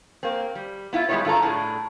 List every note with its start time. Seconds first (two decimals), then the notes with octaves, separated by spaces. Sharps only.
0.23 A#3 C4
0.55 G3
0.93 B3 E4 F4 E5
1.09 G3 G#3 B3 E4 G4 C#5
1.25 G2 F4 A4 A#5
1.42 A2 D4 G#4